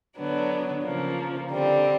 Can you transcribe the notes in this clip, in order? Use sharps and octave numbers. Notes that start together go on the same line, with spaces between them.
D3 F#3 B3 D4
C#3 F3 A#3
D3 G3 C4